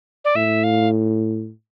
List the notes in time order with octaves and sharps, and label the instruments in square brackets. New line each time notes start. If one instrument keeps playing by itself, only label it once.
[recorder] D5
[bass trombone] A2 [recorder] E5
[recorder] F5